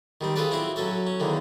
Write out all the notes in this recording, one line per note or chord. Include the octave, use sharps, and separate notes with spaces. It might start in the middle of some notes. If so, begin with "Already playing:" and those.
D#3 G3 C4
F4 G#4 A4 B4 C#5 D5
C4 E4 F#4 F5 C6
F#3 C#4 A4 C#5
C#4
E2 D3 D#3 A#3